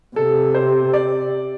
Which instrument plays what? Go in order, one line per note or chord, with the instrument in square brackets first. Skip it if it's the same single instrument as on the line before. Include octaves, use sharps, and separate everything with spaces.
[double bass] C3 [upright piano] A4
[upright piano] C5
D5